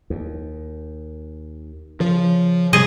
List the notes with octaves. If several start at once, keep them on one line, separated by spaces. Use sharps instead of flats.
D#2
C#3 F3
C3 G3 G#4 D#5